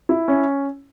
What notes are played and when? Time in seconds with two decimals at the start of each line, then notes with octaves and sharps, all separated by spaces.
0.09 E4
0.28 C#4